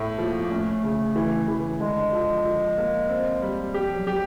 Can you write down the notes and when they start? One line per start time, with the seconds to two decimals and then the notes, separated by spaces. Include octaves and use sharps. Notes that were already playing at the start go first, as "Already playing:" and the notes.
Already playing: A2
0.18 F3 A#3
0.43 A#3
0.51 A3 C#4
0.83 C#3
1.16 E3
1.48 E3
1.80 D3 G#3
2.13 F3
2.45 F3
2.77 A#3
3.09 C4
3.42 G3
3.74 F3 G4
3.95 F#3
4.07 G4